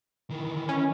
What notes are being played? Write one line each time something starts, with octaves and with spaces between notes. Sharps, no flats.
D#3 E3
C#4